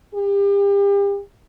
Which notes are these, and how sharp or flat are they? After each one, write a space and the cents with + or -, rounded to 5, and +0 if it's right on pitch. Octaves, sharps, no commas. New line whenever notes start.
G4 +35